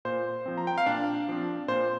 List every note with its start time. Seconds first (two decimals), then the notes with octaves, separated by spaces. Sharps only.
0.05 A#2 C5
0.46 F3 C4
0.58 A#5
0.67 G5
0.78 F5
0.86 A#2 D4 D5
1.28 F3 C4
1.68 A#2 C5